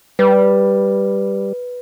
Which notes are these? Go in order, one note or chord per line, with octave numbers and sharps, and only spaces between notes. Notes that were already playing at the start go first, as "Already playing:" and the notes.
G3 B4